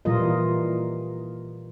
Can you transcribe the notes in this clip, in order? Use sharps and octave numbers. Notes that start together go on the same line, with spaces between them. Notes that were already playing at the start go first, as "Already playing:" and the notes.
A#2 E3 G3 F4 A#4 D#5